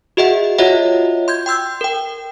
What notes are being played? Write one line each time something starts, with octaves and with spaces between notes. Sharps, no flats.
F#4 G#4 D#5 E5 F#5
F4 F#4 C#5 D#5 E5 F#5
C6 G6 G#6
G5 C6 E6 G6
A#4 G5